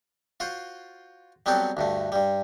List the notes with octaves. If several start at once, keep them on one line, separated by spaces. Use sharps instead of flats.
F4 F#4 C5
F#3 G3 B3 C4 G4 A4
D2 G2 A3
G2 G3